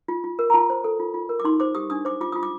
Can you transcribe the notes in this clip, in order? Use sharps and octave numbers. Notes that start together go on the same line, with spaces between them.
F4
F4
A#4
A#5
F4 A5
C5
A4
F4
F4
A#4
D6
D#4 C6
C5 D6
G4 D#6
D4 D#6
C5 D6
F4 D6
F4 D#6
D6